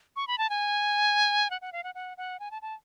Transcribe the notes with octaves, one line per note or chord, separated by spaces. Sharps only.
C#6
B5
A5
G#5
F#5
F#5
F5
F#5
F#5
F#5
G#5
A5
A5